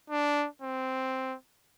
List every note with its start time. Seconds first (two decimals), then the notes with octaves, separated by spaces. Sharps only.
0.10 D4
0.62 C4